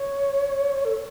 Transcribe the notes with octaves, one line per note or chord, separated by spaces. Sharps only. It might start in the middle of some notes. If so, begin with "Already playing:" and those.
Already playing: C#5
A4